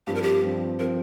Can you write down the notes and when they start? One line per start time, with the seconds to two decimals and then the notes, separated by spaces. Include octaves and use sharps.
0.07 G2 F3 C4 G4
0.15 A#4
0.23 G4
0.43 G2 F3 C4
0.79 F3 C4 A#4